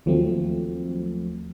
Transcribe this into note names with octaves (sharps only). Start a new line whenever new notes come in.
D#2 F3 F#3 A3 C4